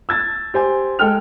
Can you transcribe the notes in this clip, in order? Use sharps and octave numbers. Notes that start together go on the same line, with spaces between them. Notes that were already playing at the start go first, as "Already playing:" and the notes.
E6 G#6 A6
G4 C5 G#5
G#3 A4 G5 F6 F7